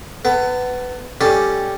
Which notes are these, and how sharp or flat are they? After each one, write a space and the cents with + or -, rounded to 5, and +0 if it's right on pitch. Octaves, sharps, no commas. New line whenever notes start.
B3 +15 A4 +45
G3 +0 C#4 +0 A4 +0